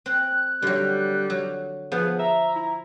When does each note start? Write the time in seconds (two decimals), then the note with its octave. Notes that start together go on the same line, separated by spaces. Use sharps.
0.06 C4 F#6
0.62 D3 F#3 G3
1.30 F#3
1.92 F3 B3 G#4
2.19 E5 A#5
2.55 E4